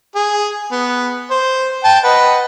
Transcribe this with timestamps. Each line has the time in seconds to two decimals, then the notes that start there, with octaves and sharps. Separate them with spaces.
0.15 G#4
0.72 B3
1.31 C5
1.84 G5 A5
2.04 B4 D#5 F#5